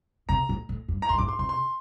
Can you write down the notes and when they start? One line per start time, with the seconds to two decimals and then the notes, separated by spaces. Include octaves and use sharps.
0.29 C3 A#5
0.49 A2
0.69 A2
0.88 G2
1.02 A#5
1.09 G2 C6
1.18 A2 D6
1.28 C6
1.39 C3 C6
1.49 C6